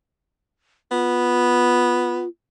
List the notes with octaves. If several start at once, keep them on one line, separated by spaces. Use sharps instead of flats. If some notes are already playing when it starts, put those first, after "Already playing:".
B3 F4